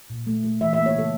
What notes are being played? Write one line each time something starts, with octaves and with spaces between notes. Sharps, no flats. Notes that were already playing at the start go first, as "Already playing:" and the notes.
A#2
A3
A3
E3 E5
A#3 E5
C#5
C#3 A4